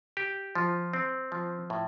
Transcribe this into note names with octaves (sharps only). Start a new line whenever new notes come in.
G4
F3
C4
F3
A2